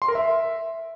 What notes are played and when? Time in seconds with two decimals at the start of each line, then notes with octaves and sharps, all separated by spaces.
0.02 C6
0.08 A#4
0.15 E5